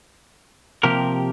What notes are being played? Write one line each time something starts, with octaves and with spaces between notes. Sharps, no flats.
C3 F3 A#3 G4 A#4